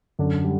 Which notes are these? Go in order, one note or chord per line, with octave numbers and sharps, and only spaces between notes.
F#2 D3
G3